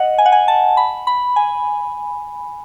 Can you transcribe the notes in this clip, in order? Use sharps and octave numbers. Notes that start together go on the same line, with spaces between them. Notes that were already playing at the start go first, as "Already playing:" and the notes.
Already playing: D#5 F#5
G#5
F#5
G#5
A5
B5
B5
G#5